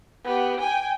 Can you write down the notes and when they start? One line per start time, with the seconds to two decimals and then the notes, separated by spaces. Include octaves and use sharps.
0.25 B3 G4
0.60 G5 G#5